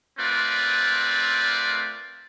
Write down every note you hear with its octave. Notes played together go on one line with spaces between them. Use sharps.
A3 C4 F4 A#4 B4 D5